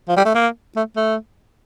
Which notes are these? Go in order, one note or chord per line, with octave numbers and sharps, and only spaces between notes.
F3
G3
A3
A#3
A3
A3